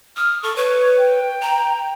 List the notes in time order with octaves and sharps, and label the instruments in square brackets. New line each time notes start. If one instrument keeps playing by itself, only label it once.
[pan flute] D#6 [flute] F6
[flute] A4 [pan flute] C#6
[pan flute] B4 [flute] C#5
[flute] G5
[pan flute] A#5